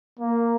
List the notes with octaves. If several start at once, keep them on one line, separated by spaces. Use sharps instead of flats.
A#3